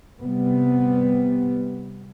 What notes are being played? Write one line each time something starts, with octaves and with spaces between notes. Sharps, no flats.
C3 G3 B3